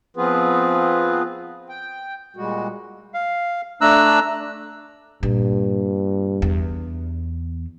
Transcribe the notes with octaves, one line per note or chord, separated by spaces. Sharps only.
F3 B3 C4 F4 G#4 B4
G5
A#2 G3 G#3 F#4
F5
A3 D4 A#5 E6 F#6
G2 A#2
E2